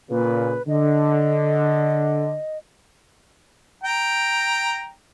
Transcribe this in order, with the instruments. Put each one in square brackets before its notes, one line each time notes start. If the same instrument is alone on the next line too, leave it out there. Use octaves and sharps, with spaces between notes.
[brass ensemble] A#2 C#3 [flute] B4
[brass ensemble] D3 [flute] D#5
[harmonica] G5 A#5